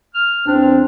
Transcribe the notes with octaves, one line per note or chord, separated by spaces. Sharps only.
F6
E2 C4 D4